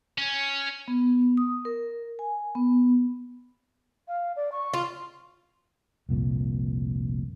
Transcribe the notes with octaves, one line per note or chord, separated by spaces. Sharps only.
C#4
B3
D#6
A#4
G#5
B3
F5
D5
C#6
F4
F1 C2 A#2